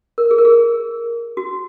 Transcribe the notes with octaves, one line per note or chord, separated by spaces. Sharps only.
A#4
G#4
A#4
G#4
F#4